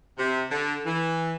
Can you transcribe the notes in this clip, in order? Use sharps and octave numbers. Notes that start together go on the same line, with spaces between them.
C3
D3
E3